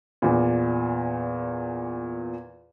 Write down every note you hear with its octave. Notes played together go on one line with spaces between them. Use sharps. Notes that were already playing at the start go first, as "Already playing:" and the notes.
E2 A#2